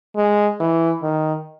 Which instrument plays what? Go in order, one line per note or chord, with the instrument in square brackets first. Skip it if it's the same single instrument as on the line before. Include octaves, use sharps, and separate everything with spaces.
[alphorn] G#3
E3
D#3